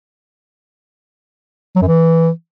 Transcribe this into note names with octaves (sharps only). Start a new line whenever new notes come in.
F#3
F#2
E3